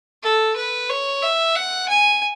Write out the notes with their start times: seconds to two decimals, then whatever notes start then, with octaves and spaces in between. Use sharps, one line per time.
0.23 A4
0.56 B4
0.89 C#5
1.22 E5
1.56 F#5
1.89 G#5